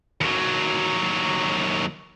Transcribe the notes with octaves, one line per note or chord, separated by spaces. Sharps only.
D#2 F#3